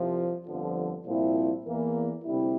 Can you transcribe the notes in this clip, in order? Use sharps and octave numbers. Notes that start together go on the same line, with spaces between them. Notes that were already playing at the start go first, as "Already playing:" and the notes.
Already playing: C2 C3 F3
G1 F2 D3 F3
C2 A#2 F3 C4 E4
E2 E3 A#3
D2 C3 G3 C4 E4